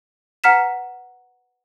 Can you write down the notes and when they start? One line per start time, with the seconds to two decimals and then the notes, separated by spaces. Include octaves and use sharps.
0.44 B4 F#5 A#5 F6 B6 E7